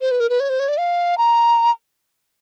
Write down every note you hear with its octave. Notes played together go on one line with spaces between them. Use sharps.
C5
B4
A#4
B4
C#5
C5
C#5
D5
F5
A#5